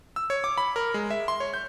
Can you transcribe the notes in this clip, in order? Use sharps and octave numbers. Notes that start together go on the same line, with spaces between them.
E6
C#5
D6
B5
A#4
G#3
E5
C6
C#5
G6